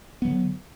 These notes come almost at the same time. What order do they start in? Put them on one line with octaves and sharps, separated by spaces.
B3 F#3 D3